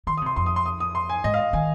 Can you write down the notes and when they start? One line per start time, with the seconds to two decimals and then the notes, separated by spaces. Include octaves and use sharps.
0.07 D#3 C6
0.17 D#6
0.22 C3 C6
0.36 F2 C6
0.46 D#6
0.56 C6
0.66 D#6
0.80 D#6
0.95 C6
1.09 G#5
1.24 G#2 D#5
1.34 F5
1.39 D#5
1.53 D#3 G#5